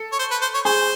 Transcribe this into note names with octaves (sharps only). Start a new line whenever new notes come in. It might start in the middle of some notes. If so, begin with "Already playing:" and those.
Already playing: A4
C#5
C5
B4
C5
C#5
G#4 C5